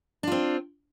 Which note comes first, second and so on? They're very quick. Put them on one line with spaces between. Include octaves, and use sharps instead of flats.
D4 F4 C4